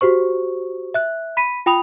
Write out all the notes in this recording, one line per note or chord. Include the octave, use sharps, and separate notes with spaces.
F#4 G4 C5 C#6
E5 F#6
B5 B6 D#7
F4 G5 B5 D#6 F7